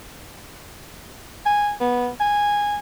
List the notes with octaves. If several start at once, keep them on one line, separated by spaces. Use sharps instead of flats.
G#5
B3
G#5